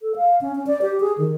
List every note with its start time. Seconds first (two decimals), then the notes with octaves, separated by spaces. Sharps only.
0.01 A4
0.16 F5
0.41 C#4
0.55 C#4
0.67 D5
0.82 G4
1.00 G#4
1.18 D#3